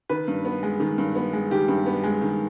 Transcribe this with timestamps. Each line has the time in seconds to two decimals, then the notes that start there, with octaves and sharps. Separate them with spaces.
0.09 D#3 B4
0.28 G2
0.45 B3
0.63 G#3
0.80 D#3
0.98 G2
1.15 B3
1.33 G#3
1.51 D#3 G4
1.68 G2
1.86 B3
2.03 G#3
2.22 D#3